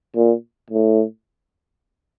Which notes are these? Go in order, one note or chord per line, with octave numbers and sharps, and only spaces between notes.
A#2
A2